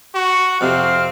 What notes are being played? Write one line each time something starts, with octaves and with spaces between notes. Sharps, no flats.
F#4 C#6
F2 C3 C4 F5 F6